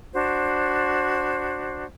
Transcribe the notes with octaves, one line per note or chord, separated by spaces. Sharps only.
D4 F#4 C5